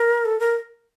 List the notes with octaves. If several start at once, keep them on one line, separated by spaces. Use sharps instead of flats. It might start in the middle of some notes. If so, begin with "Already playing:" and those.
Already playing: A#4
A4
A#4